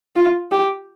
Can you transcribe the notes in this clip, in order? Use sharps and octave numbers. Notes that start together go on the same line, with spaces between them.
F4
G4